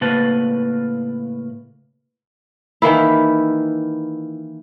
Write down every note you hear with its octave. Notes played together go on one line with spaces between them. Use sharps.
A2 C#3 A#3 B4 A5
D#3 E3 A#3 E4